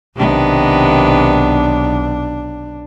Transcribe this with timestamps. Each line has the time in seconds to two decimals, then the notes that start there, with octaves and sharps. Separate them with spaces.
0.16 B1 C3 D#3 B3 D4